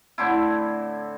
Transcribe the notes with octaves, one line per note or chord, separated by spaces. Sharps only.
A2 D3 C4 E4